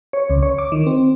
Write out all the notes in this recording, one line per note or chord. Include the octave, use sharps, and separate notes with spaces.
C#5
C#2
C#5
D6
D#3
C4